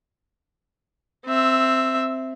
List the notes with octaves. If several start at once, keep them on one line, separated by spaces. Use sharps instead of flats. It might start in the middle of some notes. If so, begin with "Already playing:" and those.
C4 E5